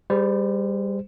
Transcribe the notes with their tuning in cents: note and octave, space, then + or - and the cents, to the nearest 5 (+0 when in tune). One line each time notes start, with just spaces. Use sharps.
G3 +20 G#4 +0 C5 -25